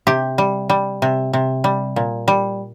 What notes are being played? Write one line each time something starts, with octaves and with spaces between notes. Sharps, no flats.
C3 G4
G3
G3
C3
C3
G3
A#2
G3